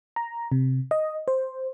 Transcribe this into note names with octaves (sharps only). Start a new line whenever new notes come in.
A#5
C3
D#5
C5